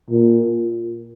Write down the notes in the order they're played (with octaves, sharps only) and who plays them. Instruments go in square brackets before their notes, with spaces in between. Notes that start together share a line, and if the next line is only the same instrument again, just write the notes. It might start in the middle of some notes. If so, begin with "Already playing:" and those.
[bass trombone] A#2